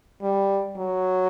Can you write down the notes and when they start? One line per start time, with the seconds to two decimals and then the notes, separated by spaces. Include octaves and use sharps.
0.22 G3
0.77 F#3